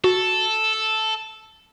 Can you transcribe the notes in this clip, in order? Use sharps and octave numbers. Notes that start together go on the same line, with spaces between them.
F#4 A4